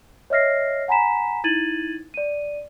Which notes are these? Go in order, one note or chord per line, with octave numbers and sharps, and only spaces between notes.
C#5 D#5 E5 F6 A#6 C7
F#5 G#5 A#5 B5 B6 E7
D#4 E4 G#6 A6 D#7 F#7
D5 D#7